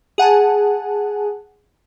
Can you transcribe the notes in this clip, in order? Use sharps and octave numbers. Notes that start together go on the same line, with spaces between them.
G#4 F#5 G#5 A5